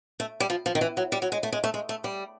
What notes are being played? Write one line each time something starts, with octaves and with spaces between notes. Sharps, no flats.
A3
G3
F3
F3
D#3
E3
F#3
G3
F#3
G#3
A3
G#3
A3
G#3
A3
G3